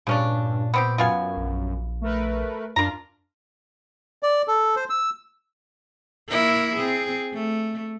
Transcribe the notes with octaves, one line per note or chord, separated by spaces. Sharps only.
G2 A#2 C#3 C#4 D4
B3 C4 G4
F#2 B3 F4 G#5
A#1
A3 A#4 B4
F#2 D4 F4 A#4 A#5
D5
A4
C5
E6
A#3 E4 A#4
C4 G#4
A3